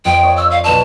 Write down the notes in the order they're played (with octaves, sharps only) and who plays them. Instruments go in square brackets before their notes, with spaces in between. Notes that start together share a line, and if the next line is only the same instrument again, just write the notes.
[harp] F2 D#5 F5 [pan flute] G5
[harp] C#5 D5 D#6
[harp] C#6 [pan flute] E6
[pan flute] F5
[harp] B1 B4 E6 [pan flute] A5